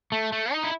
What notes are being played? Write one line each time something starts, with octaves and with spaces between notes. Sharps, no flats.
A3
A3
D#4
E4